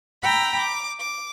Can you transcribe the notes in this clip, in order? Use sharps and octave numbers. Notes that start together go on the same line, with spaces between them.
G5 A#5 B5 E6
D6
D6